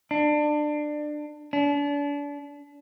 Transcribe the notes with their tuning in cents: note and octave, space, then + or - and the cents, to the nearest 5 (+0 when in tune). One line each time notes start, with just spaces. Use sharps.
D4 +25
D4 -35